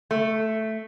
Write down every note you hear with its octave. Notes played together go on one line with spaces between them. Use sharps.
A3